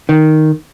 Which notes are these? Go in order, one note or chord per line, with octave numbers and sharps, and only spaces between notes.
D#3